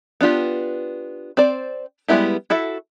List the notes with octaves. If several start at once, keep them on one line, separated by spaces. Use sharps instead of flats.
B3 D4 F4 G4
C4 C5 D5
G3 G#3 B3 E4 G4
E4 F#4 A4 E5